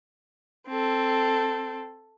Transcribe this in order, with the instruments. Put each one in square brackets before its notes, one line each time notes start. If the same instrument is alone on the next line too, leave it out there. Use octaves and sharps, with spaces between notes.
[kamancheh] C4 A4